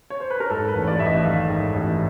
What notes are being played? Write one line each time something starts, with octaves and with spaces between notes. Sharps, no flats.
C#5
C5
B4
A#4
G#2 A4
B4
A1
C#5
D5
A1 E5
D#5
D#3 F5
G#2
A1